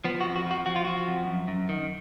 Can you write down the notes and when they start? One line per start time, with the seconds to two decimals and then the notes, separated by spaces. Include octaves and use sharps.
0.04 F3 B3
0.21 F#4
0.25 F2
0.36 F#4
0.46 F3 F#4
0.66 F3 F#4
0.76 F4
0.85 F3 F#4
1.08 F2
1.27 F#2
1.48 F#2
1.69 D#3